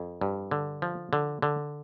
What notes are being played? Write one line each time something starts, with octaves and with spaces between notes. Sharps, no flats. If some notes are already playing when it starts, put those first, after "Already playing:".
Already playing: F2
G2
D3
F3
D3
D3